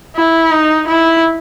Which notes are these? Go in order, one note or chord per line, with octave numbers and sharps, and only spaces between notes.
E4
D#4
E4